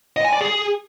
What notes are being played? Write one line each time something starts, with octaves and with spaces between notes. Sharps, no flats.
D#5
G#5
D5
G#4